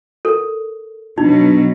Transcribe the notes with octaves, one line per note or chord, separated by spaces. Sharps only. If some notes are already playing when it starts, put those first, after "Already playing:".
A4 A#4
B2 F#3 D4 D#4